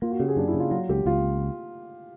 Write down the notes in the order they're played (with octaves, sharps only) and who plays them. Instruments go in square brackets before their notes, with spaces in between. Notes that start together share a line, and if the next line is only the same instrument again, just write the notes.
[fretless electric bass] A#3 [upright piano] F4
[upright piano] F#4
[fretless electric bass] C#3 [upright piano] G4
[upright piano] G#4
[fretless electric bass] F#2 [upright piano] D4
[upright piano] E4
[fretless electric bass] C#3
[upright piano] F4
[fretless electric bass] F#3 [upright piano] F4
[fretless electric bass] C#2 [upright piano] G4
[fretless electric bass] C#2 [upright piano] F4